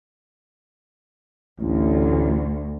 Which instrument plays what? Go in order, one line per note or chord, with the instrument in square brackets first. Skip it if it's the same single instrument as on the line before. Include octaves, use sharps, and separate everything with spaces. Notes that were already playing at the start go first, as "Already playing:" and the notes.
[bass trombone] A1 [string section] D2